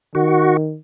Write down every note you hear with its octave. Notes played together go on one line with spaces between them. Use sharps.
D#3 F#4